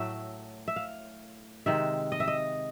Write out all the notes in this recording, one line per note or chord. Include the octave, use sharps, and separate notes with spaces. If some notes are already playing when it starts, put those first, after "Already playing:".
Already playing: A2 F#3 A3 E5
E5
F5
C3 D#3 G#3 E5
D#5
E5
D#5